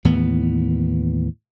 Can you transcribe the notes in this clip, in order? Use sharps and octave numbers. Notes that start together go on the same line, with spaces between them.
D#2 A2 E3 B3